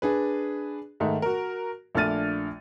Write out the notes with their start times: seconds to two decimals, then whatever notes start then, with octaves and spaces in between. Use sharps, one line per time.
0.02 D4 G#4 B4
1.00 G#2 D#3 A3
1.22 F#4 A#4
1.95 A#1 A3 D4 F6 A6 D#7